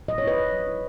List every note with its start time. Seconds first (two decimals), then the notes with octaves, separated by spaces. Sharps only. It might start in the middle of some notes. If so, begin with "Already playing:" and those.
0.08 F#3 D#5
0.18 C#5
0.23 E4 B4 D#5
0.38 E4
0.52 F#3
0.67 E4